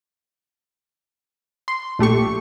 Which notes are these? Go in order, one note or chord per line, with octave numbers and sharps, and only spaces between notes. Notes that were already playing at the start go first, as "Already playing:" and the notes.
C6
A#1 A3 G4 C#6